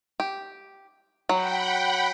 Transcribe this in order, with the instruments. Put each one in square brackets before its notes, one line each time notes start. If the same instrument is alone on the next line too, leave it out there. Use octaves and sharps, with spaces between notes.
[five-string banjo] G4
[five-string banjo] F#3 [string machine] F#5 G5 B5